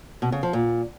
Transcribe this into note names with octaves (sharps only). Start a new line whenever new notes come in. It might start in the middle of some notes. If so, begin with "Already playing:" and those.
B2
C#3
F3
A#2